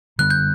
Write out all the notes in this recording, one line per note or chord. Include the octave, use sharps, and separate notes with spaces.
F#2 D3 G3 B3 F#6
G6